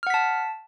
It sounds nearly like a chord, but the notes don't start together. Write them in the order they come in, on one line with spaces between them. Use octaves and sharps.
F6 F#5 B6 A5